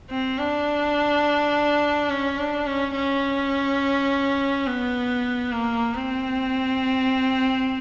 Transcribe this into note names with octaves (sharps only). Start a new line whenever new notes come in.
C4
D4
C#4
D4
C#4
C#4
B3
A#3
C4